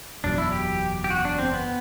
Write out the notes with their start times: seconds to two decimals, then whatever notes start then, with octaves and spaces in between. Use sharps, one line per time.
0.24 F#1 E2 B2 F#3 D4
0.38 E4
0.52 G4
1.04 G4
1.10 F#4
1.25 D4
1.39 C4
1.53 B3